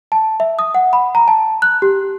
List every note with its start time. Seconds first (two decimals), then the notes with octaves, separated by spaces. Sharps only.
0.12 A5
0.40 E5
0.59 D#6
0.74 F#5
0.93 B5
1.15 A#5
1.28 A5
1.62 F#6
1.82 G4